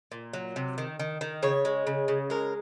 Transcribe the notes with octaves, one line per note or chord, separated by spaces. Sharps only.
A#2
F#3
C3
D#3
D#3
D#3
C#3 C#5
G#3
C#3
C#3
G#3 A#4